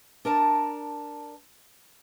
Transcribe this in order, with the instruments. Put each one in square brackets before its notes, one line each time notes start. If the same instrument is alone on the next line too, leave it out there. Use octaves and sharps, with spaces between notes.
[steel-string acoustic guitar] D4 A#4 A5 A#5